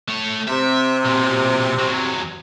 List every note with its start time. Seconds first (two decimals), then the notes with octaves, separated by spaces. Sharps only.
0.08 A3 C#5
0.48 C3 E5
1.05 B1 A#2
1.79 E2 F#3